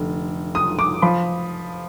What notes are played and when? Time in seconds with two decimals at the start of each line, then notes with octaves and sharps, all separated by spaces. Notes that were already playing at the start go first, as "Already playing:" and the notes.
Already playing: F1 D3
0.55 D#6
0.79 D6
1.02 F3 B5